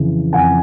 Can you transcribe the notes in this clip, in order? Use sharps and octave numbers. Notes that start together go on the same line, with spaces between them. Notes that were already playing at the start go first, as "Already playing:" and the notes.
Already playing: F2 C#3 E3
F2 F#5 G#5